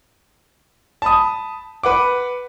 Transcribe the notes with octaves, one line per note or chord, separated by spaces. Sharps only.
A5 B5 D#6
B4 F#5 D6